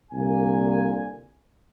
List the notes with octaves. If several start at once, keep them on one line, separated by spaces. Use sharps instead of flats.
C2 A#2 D3 A#3 G#5